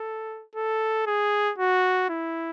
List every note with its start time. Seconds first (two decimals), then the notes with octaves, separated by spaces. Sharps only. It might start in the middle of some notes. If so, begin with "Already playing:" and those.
Already playing: A4
0.56 A4
1.07 G#4
1.58 F#4
2.09 E4